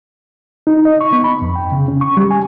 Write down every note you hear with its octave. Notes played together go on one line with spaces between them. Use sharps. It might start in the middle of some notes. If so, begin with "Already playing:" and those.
D#4
D#5
C#6
B3
B5
F2
G5
C#3
C#4
C#6
G3
G#5